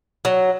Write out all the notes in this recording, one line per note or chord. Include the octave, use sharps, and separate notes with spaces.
F#3